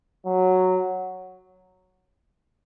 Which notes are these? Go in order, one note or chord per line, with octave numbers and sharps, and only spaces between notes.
F#3